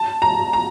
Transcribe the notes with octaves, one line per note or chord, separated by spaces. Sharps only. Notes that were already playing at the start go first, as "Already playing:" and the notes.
Already playing: A5
A#5
A#5